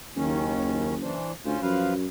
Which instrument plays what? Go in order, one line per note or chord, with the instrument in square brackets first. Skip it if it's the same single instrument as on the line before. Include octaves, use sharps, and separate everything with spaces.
[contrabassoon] F#1 [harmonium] D#2 D#3 C#4
[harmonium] E3 D4 C5
[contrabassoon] D2 [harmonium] C#4 F4 C5
[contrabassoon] F#2 [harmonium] F3 B4 F5